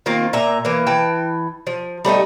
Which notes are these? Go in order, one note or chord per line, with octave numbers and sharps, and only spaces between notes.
D#3 A#3 C4 F4
A#2 E5 A#5
E3 A#3
E3 G5 A5
F3
G3 A3 C4 D#4